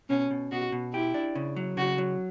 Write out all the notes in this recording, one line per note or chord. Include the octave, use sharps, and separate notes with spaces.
B2 C#4
B2
B2 F#4
B2
E4 G4
D4
C#3
F#3
C#3 F#4
F#3